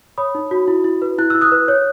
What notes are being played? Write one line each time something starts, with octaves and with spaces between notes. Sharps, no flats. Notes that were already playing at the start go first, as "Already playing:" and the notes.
C#5 B5 D#6
D#4
F#4
E4
E4
B4
E4 F#6
E4 E6
D#6 F#6
B4
C#5